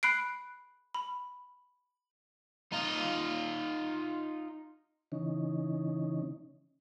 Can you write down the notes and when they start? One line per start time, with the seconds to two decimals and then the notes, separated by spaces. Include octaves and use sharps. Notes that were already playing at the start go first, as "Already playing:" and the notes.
0.03 B5 F#6 C7 D7
0.94 B5
2.72 D#4 F4
5.12 C#3 E3 C#4 D#4